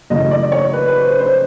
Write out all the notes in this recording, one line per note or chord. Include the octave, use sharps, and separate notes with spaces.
F#2 C#3 E3 A3 D#5
D5
C#5
B4
B4
C5
C5